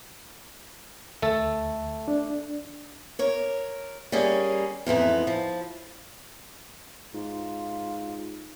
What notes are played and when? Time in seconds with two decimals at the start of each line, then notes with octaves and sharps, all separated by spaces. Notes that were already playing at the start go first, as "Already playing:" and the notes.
1.22 D2 A3 A4
2.08 D4
3.19 A#4 C#5
4.12 G3 A#3 C#4 G#4
4.87 F2 G#2 E3 B3
5.27 F3
7.14 G#2 F4